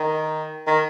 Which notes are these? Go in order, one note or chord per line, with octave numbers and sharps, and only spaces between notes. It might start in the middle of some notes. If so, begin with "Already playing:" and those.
Already playing: D#3
D#3